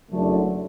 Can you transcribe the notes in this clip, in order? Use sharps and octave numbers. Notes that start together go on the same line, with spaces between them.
F#1 F#2 D3 A3